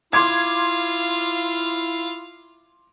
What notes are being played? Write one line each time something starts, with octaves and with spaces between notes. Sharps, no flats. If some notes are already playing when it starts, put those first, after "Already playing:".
E4 F4 F5 C6 D6 G#6